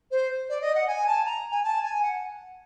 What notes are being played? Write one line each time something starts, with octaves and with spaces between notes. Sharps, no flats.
C5
D5
D#5
F#5
G#5
A5
A#5
G#5
A5
G#5
F#5